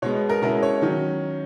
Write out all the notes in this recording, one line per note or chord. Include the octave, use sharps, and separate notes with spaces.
B2 G#3 B3 C#5
A#4
B2 G#3 C#4 E4 A#4
C#5
D#3 F#3 C#4